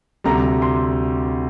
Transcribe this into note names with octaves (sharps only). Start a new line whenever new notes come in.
D2 C3 G3 A#5
C6